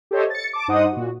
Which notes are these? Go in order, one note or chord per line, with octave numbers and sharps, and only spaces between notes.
G4 A4 C5 C#5 D#5 E5
A6 C#7
A5 D6
G2 D#4 C5 D#5 F#5 D#6
A#2 F#4